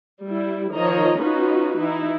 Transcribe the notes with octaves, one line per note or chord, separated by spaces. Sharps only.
G3 E4
D#3 F3 C#5 D#5 A#5
C#4 D#4 F4 F#4 B4
E3 D#4 E4